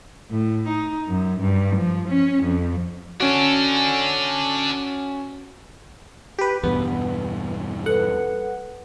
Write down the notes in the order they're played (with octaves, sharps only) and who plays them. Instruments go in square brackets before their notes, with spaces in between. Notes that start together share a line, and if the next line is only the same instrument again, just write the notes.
[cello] A2
D#4
F#2
G2
F3
C#4
F2
[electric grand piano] C#4 F#4 [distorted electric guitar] D4 A4
[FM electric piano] G4 B4
[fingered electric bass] E2 G2 B2 [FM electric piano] B3
[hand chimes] A4 B4 [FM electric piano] F#5